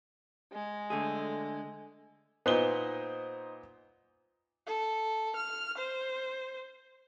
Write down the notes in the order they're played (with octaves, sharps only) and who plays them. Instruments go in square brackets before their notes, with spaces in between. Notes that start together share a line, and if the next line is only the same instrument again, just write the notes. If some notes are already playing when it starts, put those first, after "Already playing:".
[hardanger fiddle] G#3
[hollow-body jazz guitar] D3 A3 G#4
[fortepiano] A#2 B3 [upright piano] D#4 C5 G7
[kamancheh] A4
F6
C5